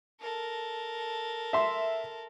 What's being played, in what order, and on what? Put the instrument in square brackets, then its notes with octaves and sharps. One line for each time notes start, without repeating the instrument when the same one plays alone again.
[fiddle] A4 A#4
[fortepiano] E5 C6